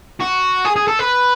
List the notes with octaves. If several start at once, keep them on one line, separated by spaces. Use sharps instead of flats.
F#4
G#4
G#4
A4
B4